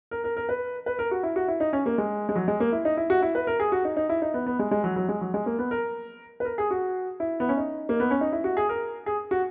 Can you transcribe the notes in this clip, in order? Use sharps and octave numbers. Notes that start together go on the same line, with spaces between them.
A#4
A#4
A#4
B4
B4
A#4
F#4
E4
F#4
E4
D#4
C#4
A#3
G#3
G#3
F#3
G#3
A#3
E4
D#4
E4
F#4
E4
B4
A#4
G#4
F#4
D#4
D#4
E4
D#4
B3
B3
G#3
G#3
F#3
F#3
G#3
F#3
G#3
A#3
B3
A#4
B4
A#4
G#4
F#4
E4
B3
C#4
D#4
A#3
B3
C#4
D#4
E4
F#4
G#4
A#4
G#4
F#4